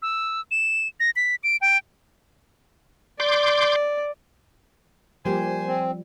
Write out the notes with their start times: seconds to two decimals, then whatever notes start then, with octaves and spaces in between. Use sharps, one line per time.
0.02 E6
0.51 E7
1.00 A#6
1.16 B6
1.44 D7
1.61 G5
3.20 D5 C6 D6 G6
5.25 F3 G3 A#3 G4 C5 G#5
5.67 C4